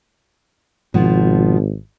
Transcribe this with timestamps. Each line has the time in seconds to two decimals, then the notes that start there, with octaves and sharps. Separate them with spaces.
0.94 G#1 B2 F3